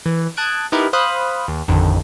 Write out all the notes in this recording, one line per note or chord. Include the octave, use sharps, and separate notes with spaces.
E3
A5 D#6 F#6 G#6 D7
B3 D#4 E4 G4 A#4 B4
C5 F5 B5 D#6 F#6
D#2
A1 F2 D3 D#3